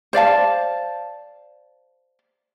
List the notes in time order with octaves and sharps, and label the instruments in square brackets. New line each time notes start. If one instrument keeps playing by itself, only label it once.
[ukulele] C5 D5 F5 A5